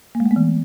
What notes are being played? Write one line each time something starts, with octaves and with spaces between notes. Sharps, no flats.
A#3
G#3
A3
B3
E3